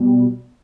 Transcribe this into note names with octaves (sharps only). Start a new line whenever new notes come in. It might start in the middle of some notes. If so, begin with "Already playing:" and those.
Already playing: B2 G3